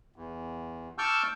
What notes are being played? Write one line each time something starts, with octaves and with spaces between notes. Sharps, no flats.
E2
A5 C#6 D6 E6 F6 G6